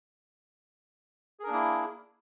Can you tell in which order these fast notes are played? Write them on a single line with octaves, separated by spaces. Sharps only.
G#4 A#4 D4 A#3 E4